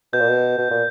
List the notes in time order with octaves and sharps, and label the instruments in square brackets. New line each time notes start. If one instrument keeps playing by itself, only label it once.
[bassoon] B2 [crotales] G6
[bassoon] A#2
B2
B2
A#2